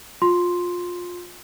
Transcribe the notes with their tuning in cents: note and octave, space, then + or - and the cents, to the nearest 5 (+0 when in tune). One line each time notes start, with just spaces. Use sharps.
F4 +20 C6 +0